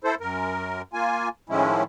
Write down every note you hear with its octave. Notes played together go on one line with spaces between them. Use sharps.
E4 A4 C5
F#2 A#4
A#3 F4 G#5
A2 D#3 F3 G#3 C#4 E4